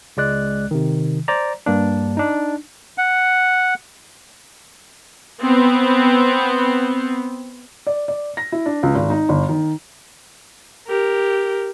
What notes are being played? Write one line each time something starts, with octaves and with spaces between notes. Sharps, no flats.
C#2 G#3 D5 F#6
C3 D#3
C5 D5 A#5
G2 A#3 D4
D4 D#4
F#5
B3 C4
D5
D5
A#6
E4
D4
C#2
G#1
D#4
G1
D#3
G4 A#4